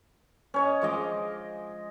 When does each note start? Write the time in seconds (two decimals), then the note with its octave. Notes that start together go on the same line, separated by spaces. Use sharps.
0.54 C#4 C#5 D#5
0.82 F3 G#3 D#5 D6